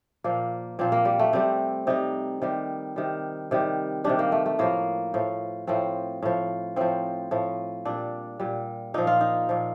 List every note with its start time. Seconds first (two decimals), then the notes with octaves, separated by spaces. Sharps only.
0.24 A#2 F3 A#3
0.79 A#2 F3 C4
0.92 A#3
1.05 G3
1.19 A3
1.33 C3 G3 C4
1.87 C3 G3 D#4
2.42 C3 D#3 G3
2.96 C3 D#3 G3
3.51 C3 D#3 G3
4.04 C3 D#3 G3 D4
4.19 A#3
4.32 A3
4.46 A3
4.59 A2 F3 A#3
5.14 A2 F3
5.67 A2 F3 C4
6.22 A2 F3
6.76 A2 F3 C4
7.31 A2 F3
7.85 A#2 G3 D4
8.40 A#2 G3
8.94 A#2 F3 D#4
9.07 F4
9.21 D#4
9.49 A#2 F3